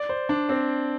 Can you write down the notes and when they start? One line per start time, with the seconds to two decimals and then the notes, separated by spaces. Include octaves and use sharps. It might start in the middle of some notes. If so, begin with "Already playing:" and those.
Already playing: D5
0.09 C5
0.29 D4
0.49 C4